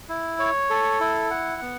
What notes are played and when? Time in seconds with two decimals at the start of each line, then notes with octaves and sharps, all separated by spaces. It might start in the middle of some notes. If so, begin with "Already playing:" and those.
0.09 E4
0.39 C#5
0.70 A4
1.00 E4
1.31 F#5
1.62 B3